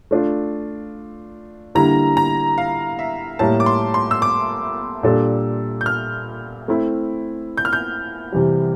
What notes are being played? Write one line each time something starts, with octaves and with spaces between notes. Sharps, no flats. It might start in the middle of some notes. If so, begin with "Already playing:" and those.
A3 D4 F4
D3 G3 A#3 E4 A#5
A#5
F5
E5
A2 G3 A#3 A5
D6
C6
C6
E6
D6
A#2 G3 D4 A4
G6
F6
A3 C4 E4
G6
F6
G6
C3 E3 G3